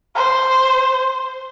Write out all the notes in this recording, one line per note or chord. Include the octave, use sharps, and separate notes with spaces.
C5